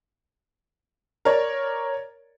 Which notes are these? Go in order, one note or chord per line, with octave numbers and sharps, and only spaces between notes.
A#4 C#5 D5